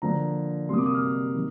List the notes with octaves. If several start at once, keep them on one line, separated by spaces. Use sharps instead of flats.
D3 F3 A#3 A#5
C3 G3 A#3 C6 D#6
D6
D#6
F6
D#6
D#3